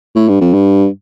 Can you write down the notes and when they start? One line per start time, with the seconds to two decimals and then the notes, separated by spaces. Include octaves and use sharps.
0.15 A2
0.28 G2
0.41 F2
0.54 G2